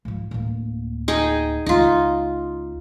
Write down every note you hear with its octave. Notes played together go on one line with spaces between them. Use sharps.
G#2 F3
D1 A#3
D#4 G#4 G5
C#2 C#4 D#4 F4